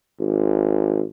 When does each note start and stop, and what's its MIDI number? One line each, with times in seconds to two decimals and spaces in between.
0.20 1.03 32